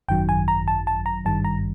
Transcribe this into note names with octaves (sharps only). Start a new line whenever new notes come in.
G#1 F#2 D#3 F#3 G5
G#5
A#5
A5
A5
A#5
G#1 G2 D#3 G3 A5
A#5